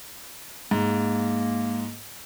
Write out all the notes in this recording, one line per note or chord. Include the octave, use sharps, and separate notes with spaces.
G#2 A#3